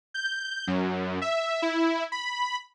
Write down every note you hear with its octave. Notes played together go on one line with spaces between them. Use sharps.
G6
F#2
E5
E4
B5